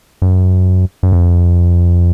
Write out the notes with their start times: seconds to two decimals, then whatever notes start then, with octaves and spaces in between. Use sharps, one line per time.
0.22 F#2
1.03 F#2
1.12 F2